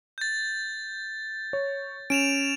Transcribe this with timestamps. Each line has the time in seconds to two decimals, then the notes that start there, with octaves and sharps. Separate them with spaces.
0.18 G6 A6
1.53 C#5
2.10 C#4 D7 E7 F7